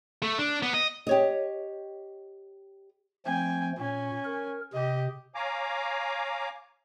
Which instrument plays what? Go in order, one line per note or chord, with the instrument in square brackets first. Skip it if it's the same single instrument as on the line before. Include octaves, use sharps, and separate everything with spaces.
[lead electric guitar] A3
D4
B3
D#5
[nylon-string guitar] G4 C#5 D#5
[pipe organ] F3 A3 C4 [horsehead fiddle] G5 G#5
[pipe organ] A#2 [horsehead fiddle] C#4 G#5
[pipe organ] A#4
[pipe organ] C3 [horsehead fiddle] G4 D#5
[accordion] C#5 F5 G#5 A#5 D6